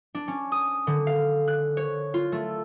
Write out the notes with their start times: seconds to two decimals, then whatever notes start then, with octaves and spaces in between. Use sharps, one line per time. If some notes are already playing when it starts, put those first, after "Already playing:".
0.15 D4
0.28 C#4
0.52 D#6
0.87 D3
1.07 F5
1.48 F#6
1.77 C#5
2.14 F4
2.32 A3